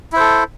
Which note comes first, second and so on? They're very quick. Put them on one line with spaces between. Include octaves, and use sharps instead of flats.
E4 C5 A4